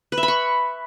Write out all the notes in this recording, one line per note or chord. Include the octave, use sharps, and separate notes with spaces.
B4
E5
B5
C#6